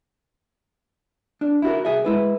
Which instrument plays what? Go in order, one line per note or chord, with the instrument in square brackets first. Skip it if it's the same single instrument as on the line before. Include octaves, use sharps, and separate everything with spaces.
[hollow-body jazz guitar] D4
E4 F#4 A#4
C2 G#4 E5
G#3 E4 B4